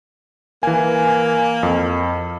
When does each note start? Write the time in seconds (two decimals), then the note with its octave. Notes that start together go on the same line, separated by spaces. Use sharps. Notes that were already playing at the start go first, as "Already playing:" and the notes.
0.63 E3 A#3 G#5
1.63 F2